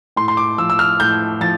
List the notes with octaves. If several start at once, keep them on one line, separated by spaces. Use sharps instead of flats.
A2 C6
C6
D6
F3 E6
E6
F6
A2 G6
F3 A6